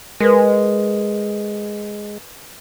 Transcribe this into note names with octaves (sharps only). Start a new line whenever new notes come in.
G#3 A#4 B4